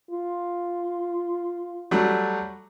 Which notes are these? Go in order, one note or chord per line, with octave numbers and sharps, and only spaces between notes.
F4
F#3 G3 A3